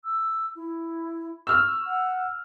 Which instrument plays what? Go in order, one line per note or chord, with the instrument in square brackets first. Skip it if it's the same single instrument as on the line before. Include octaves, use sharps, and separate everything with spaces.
[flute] E6
E4
[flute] C#6 [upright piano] E6 F6
[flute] F#5